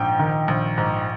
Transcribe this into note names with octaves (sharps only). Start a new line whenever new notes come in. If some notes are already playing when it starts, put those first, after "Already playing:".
Already playing: A#1 G#2 G5
D#3
A#1
G#2